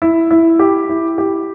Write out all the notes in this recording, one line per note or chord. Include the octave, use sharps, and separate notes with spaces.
E4
E4
G4
E4
G4